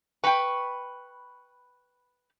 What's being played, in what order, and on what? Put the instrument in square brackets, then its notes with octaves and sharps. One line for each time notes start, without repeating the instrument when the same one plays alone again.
[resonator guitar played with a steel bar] B4 G5 [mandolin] B5 C#6